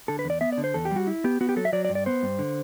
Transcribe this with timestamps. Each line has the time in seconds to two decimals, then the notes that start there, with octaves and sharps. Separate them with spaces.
0.08 D3 A4
0.19 B4
0.24 E2
0.30 D5
0.41 B3 E5
0.52 D5
0.58 D3
0.64 C5
0.74 E2 A4
0.85 G4
0.91 G3 F#4
1.07 E4
1.24 B3 G4
1.41 B3 F#4
1.49 G4
1.56 F#3 A4
1.65 E5
1.73 F#3 D5
1.85 D5
1.89 G2
1.95 D5
2.06 B3 C5
2.23 G2
2.39 D3